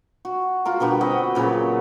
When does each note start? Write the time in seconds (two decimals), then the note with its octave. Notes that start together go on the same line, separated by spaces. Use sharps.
0.25 F#4
0.65 F4 F#4 A#4
0.80 B2 D3 G3 F#4
1.01 C4 D#5 B5
1.35 A#2 C#3 F#3 B4